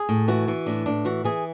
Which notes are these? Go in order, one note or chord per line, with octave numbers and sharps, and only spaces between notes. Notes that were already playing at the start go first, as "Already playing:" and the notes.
Already playing: G#4
A2
E3 F#4
E3
A2 D4
A2 D4
E3 F#4
E3 G#4